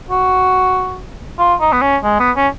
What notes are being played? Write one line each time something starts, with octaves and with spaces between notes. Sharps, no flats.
F#4
F4
D#4
B3
C#4
G#3
B3
C#4